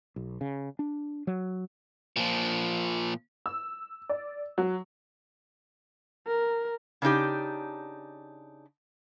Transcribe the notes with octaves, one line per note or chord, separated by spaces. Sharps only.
B1
C#3
D4
F#3
A#2 F3
E6
D5
F#3
A#4
C#3 D4 D#4 G4